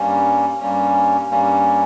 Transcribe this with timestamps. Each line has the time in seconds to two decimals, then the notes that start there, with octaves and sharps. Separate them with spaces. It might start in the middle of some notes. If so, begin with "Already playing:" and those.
Already playing: G2 G3 A#3 C#4
0.60 G2 G3 A#3 C#4
1.31 G2 G3 A#3 C#4